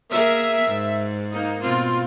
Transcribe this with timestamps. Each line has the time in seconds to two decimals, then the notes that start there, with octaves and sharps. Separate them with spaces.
0.11 A#3 G#4 A#4 E5
0.67 G#2
1.32 A#3 D#4
1.62 B2 C4 F4